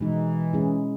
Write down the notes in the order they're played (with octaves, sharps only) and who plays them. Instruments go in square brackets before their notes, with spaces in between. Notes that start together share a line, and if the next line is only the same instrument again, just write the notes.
[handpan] B2 G#3 D#4 [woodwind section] E3
[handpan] G#3 C#4 E4 G#4